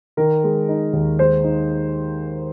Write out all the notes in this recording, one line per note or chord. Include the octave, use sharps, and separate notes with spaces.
D#3 A#4
G#3
D#4
D#2
G#3 C5
D#4